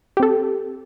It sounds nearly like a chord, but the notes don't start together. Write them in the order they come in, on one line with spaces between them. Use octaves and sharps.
G4 C4 A4